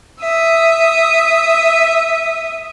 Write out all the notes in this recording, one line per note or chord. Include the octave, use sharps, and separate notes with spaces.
E5 D#6